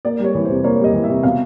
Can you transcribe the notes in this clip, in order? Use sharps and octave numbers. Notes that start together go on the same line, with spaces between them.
A#3 D5
G3 C#5
E3
C3 C5
A#3 C#5
G3 D#5
E3
C3 E5
B2 F5